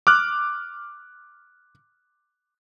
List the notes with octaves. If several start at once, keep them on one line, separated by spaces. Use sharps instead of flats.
D6 F6 F#6